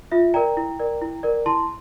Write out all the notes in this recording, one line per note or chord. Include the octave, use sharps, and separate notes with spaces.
F4 E5
A#4 D5 G5 A#5
E4
A#4 D5
E4
A#4 D5
E4 A5 C6